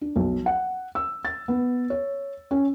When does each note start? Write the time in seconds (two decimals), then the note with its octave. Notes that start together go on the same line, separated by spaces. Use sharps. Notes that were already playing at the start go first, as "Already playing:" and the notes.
0.01 D4
0.16 B1
0.46 F#5
0.95 E6
1.25 A6
1.48 B3
1.90 C#5
2.51 C#4